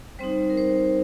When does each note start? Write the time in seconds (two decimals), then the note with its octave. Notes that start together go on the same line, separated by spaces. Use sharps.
0.19 G3 C4 D#4 C5
0.50 A#4
0.58 C5